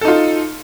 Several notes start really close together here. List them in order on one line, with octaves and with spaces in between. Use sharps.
A4 D#4 F4